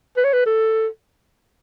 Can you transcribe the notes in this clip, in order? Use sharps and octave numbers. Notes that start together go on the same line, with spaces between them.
B4
C#5
B4
A4